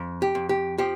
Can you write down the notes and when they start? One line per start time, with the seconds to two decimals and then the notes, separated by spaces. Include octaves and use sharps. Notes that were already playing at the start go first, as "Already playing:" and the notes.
Already playing: F2
0.22 G4
0.35 F2
0.49 G4
0.78 F3 G4